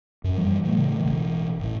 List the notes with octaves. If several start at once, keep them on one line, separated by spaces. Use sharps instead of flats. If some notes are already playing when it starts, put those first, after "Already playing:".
F#2
G2 E3 F3 G3
A#2 E3 G3 A3
A2 C#3 E3 A3
A1 B2 E3
A1 A2